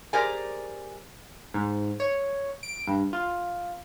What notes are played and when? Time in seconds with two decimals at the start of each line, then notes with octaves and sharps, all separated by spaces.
0.13 G4 G#4 A#4 C5 D5 G#5
1.54 G#2
2.00 C#5
2.63 D7
2.87 G2
3.13 F4